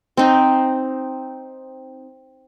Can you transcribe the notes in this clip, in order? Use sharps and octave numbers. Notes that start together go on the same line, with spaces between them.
C4 D#4